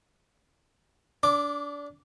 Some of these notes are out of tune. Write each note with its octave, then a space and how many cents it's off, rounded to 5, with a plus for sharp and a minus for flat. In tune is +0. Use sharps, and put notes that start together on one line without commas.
D4 -25 D6 +0